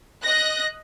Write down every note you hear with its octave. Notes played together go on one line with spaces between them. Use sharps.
D#5 F#6 A#6